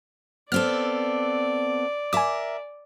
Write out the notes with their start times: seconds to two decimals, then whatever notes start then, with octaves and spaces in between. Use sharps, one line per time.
0.52 B3 C4 A4 D5 F6
2.13 A#4 E5 G#5 D6